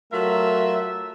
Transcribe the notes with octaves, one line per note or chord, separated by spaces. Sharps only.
F#3 A3 F4 A#4 E5